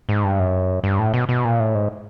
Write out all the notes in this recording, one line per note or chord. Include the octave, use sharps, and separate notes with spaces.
G#2
G2
F#2
G2
A2
B2
B2
A#2
A2
G#2